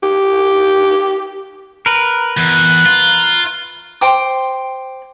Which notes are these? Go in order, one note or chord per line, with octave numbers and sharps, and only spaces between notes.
G4
A#4 B4
E2 F#6
F4
C5 G5 D6